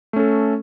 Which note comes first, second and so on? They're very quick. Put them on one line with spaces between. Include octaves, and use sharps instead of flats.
A3 C#4 A4